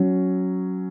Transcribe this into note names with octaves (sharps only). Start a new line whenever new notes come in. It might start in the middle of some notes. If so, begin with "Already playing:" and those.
Already playing: F#3 C#4